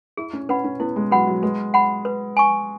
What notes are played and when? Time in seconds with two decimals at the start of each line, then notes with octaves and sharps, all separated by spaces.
0.17 E4 G#4
0.33 C#4
0.49 C#4 B4 F#5 B5
0.64 C#4
0.80 B3 E4
0.96 G#3
1.12 F#3 B4 F#5 B5
1.27 F#3
1.43 G#3 B4
1.74 F#5 B5
2.05 B4
2.37 G#5 C#6